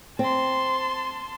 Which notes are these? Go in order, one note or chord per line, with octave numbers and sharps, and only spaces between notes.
C4 A5 C6